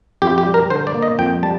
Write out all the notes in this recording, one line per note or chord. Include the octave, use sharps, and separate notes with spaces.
F2 G4
G4
G3
A#4
D3 C5
D5
A#3
D#5
F2 G5
G3 A5